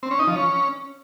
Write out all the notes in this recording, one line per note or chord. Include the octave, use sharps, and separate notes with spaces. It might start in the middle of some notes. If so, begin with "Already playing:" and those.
C4
C#4
D#4
F3
C#4